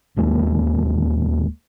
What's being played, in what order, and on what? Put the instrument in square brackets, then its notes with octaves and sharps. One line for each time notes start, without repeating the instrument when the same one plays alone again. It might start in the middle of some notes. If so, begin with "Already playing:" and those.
[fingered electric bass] D1 D#2 G#3 A#3